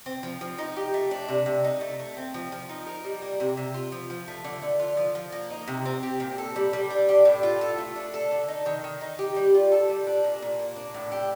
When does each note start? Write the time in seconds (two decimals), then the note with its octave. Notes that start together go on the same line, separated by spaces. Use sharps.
0.06 C4
0.23 F3
0.41 F3
0.58 D#4
0.76 G4
0.94 A3
1.11 D4
1.29 C3
1.46 C3
1.64 D#4
1.81 A3
2.00 A3
2.17 C4
2.34 F3
2.52 F3
2.69 D#4
2.87 A#4
3.04 G3
3.22 A#3
3.40 C3
3.57 C3
3.74 F4
3.92 F3
4.10 F3
4.28 A3
4.44 D3
4.62 D3
4.80 F4
4.97 F3
5.15 F3
5.32 A#3
5.50 D#4
5.68 C3
5.85 C4
6.03 G4
6.20 A#2
6.38 A4
6.56 G3
6.73 G3
6.90 D4
7.09 G4
7.25 A2
7.43 F4
7.61 A4
7.78 A3
7.96 D4
8.14 A4
8.31 D3
8.48 D#4
8.66 D#3
8.84 D#3
9.01 D#4
9.19 G4
9.36 G3
9.55 F4
9.72 A4
9.89 G3
10.07 D4
10.24 A#2
10.42 A#2
10.60 A#3
10.76 D4
10.94 A2
11.12 G4